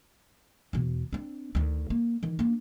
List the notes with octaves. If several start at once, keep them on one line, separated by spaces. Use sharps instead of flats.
E2 B2
C4 D4
D2 D#3
A#3
D#3 E3
A#3 D4